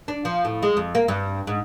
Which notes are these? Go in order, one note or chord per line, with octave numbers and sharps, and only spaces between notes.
D4
F3
A2
G#3
F2
A#3
G2
G#2